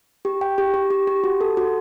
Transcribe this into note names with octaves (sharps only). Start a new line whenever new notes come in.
G4
G5
G4
G4
G4
G4
F#4
A4
F#4